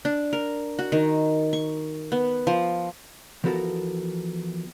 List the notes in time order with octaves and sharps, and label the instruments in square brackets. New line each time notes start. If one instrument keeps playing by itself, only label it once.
[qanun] D4
A#4
F#4
D#3
C#6
B3
F3
[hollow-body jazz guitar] E3 F3 B3 F#4 A4 A#4